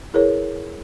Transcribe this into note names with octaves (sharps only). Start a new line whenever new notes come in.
E4 G#4 A#4 B4 C#5